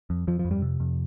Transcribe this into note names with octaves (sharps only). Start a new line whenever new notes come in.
F2
F2 F3
F3
F2
G2 G3
C3
F2